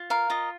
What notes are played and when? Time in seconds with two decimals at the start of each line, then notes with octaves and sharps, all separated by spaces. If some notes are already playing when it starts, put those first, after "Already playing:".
Already playing: F4
0.10 A#4 F5
0.30 F4 D#5